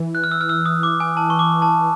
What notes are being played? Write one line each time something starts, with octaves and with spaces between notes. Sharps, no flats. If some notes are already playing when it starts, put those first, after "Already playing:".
Already playing: E3
F#6
F6
E6
F6
E6
D#6
D6
G#5
A5
C#6
D6
A5